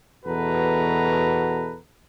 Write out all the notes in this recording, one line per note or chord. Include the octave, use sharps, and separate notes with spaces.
E2 B2 F#4 A4 B4 A#5